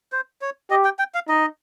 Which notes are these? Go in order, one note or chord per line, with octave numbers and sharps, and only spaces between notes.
C5
C#5
G4 D#5
G5
G5
F5
D#4 D#5